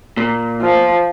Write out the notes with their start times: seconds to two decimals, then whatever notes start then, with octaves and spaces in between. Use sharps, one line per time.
0.17 A#2
0.61 F3